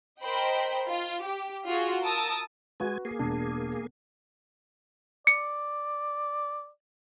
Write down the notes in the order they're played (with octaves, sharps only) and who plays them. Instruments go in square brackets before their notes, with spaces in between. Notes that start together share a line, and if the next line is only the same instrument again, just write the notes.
[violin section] A#4 C5 D#5 G5 B5
F4
G4
F4 F#4 G#4
A#4 A5 D#6 E6 A6
[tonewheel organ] G#3 G#5 [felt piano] F#4 B4
[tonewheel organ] A#3 G#4
[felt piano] E1 D4
[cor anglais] D5 [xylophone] C#7